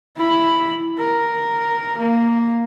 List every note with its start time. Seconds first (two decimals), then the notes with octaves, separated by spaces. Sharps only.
0.17 E4 B5
0.99 A#4
1.98 A#3